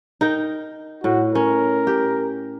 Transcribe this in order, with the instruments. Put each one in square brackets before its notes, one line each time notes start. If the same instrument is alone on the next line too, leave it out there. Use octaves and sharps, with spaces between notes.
[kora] D#4 A#4 G5
[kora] A2 [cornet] F#4
[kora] C#4 [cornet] A#4
[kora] G4